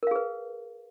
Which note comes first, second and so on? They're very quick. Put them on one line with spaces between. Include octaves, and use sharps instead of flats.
A#4 F5 G#4 B4